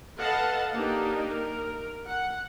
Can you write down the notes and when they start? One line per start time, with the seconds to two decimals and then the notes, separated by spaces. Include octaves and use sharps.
0.19 A4 B4 D#5 F5 F#5 A5
0.76 A#3 D4 D#4 G4
1.31 A#4
2.07 F#5